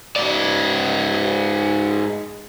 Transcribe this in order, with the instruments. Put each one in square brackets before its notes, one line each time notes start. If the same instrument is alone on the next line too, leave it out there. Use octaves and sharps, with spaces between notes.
[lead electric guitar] G#2 D5